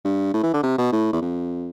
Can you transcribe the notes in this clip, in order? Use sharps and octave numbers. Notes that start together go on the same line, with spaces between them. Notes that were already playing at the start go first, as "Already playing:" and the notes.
G2
A2
E3
D3
C3
B2
A2
E2
F2